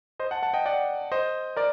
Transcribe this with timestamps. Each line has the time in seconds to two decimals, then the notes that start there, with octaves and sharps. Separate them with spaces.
0.19 C5 D#5
0.31 F#5 A5
0.42 F#5 A5
0.54 D#5 G5
0.66 D5 F#5
1.12 C5 D#5
1.56 A#4 D5